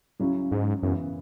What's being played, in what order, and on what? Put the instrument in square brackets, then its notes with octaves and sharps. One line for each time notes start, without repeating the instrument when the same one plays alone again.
[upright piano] C#2 C#3 F#3 C#4 E4
[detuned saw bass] G#2
[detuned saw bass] F#2 [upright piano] C#3 E3 B3 E4